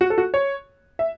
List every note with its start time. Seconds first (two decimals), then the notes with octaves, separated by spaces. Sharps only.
0.01 F#4
0.10 A4
0.18 F#4
0.34 C#5
0.99 E5